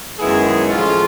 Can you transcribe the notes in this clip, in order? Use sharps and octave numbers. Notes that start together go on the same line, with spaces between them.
F#2 D#3 G#3 B3 E4 G#4
A2 F3 G#3 C#4 F4